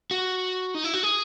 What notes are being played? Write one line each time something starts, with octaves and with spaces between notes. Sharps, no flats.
F#4
D#4
E4
F#4
G#4